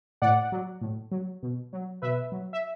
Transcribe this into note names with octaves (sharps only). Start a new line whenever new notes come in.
A2 D5 F#5
F#3
A2
F#3
B2
F#3
B2 B4 E5
F#3
E5